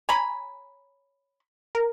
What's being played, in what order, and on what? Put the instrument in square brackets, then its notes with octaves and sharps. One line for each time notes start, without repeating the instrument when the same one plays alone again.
[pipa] C#5 A#5 B5 [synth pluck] G#5
[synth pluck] A#4